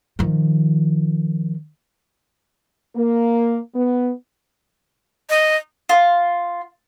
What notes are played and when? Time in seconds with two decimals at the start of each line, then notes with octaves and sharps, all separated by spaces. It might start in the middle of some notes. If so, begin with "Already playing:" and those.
0.19 D#3 F3
2.96 A#3
3.74 B3
5.30 D#5
5.89 F4